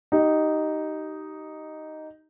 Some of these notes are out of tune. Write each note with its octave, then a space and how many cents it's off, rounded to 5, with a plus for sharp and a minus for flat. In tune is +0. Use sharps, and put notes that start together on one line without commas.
D#4 +0 G4 -25